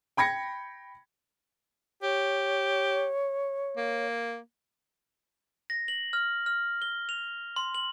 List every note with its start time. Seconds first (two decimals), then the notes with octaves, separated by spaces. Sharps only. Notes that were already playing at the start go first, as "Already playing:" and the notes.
0.17 G5 B5 G#6 A#6 C#7
2.03 G4 C#5
3.77 A#3
5.70 A#6
5.88 F#7
6.13 F6
6.46 F6
6.82 G7
7.09 F7
7.56 C6
7.75 F#7